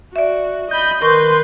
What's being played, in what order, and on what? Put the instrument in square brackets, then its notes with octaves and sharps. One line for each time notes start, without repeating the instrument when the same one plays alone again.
[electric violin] F#4 [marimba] D5 E5
[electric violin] D#5 B5 [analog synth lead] G6
[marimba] D#3 A#4 C#6 [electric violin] B4 C6